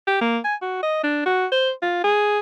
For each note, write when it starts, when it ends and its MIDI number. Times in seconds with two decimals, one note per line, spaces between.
0.07 0.21 67
0.21 0.38 58
0.44 0.55 80
0.62 0.81 66
0.83 0.99 75
1.03 1.23 62
1.26 1.46 66
1.52 1.71 72
1.82 2.00 65
2.04 2.39 68